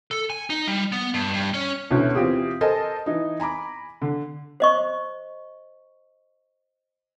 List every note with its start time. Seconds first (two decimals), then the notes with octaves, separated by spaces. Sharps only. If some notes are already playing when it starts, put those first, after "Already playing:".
0.11 A4
0.30 G#5
0.50 D#4
0.68 G3
0.92 B3
1.14 G2
1.33 G2
1.54 C#4
1.91 D2 B2 E3 C#4
2.15 E3 C4 F4 G4 G#4
2.61 A4 A#4 C5 D#5 G#5 A5
3.06 E3 D#4
3.40 G#5 A#5 B5 D6
4.02 D3
4.60 C5 D#5 C#6